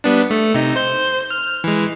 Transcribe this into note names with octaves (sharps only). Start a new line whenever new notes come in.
G3 B3 D4
A3
C3 D#4
C5 G6
F6
E3 G#3